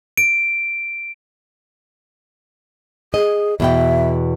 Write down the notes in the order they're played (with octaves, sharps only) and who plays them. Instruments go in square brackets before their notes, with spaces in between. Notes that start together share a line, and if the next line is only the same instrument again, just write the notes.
[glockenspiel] D7
[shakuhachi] G#4 [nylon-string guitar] D#5
[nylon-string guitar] E2 B2 G5 [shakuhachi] E5